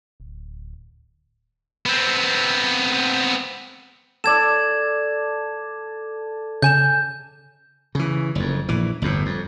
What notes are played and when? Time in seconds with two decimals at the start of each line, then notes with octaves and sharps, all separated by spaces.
0.20 D1
1.86 B3 C4
4.24 A4 D5 G#6 E7
6.62 C#3 G#5 G6 E7
7.95 C#3 E3
8.35 F#1 F2
8.69 A#1 E3
9.02 G1 E2 A2
9.26 F2